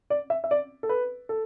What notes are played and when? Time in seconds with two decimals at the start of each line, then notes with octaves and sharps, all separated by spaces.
0.10 D5
0.30 E5
0.44 E5
0.51 D5
0.83 A4
0.89 B4
1.29 A4